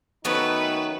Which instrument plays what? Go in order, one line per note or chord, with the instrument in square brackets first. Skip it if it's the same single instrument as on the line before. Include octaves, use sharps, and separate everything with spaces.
[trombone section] D#3 C#4 D#4 [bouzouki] F#3 A3 B3 [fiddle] B4